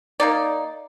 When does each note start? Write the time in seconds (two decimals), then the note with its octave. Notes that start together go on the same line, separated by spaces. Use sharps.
0.20 A#3 D#4 D5